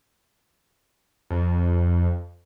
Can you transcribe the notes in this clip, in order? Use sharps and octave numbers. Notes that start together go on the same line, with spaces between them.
F2